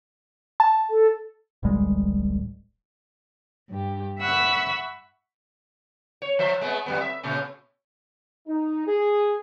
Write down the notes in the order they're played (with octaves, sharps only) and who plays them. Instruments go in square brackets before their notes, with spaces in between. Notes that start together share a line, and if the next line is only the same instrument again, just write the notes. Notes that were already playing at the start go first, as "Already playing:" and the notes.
[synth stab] A5
[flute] A4
[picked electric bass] D1 A1 G3 G#3
[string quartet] G2 G4
E5 F#5 B5 C#6 E6 F#6
[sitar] C#5
F3 C5 E5
G#3 A3 B3
F2 G3 B3
E5
A#2 C#3 A3
[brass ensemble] D#4
G#4